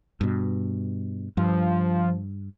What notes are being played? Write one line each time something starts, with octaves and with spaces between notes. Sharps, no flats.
G2 B2
G2 F3